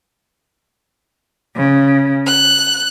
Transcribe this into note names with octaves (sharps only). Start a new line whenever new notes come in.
C#3
F#6